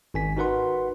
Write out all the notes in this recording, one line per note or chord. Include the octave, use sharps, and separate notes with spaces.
G#1 G#5 B6
D#4 F#4 A#4 B4 F#5 C6